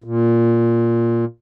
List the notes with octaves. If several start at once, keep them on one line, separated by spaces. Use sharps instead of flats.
A#2